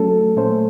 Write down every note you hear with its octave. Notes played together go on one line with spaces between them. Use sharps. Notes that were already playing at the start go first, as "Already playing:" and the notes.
Already playing: F#3 A3 C#4 A4
A#2 A3 C#4 A4 C5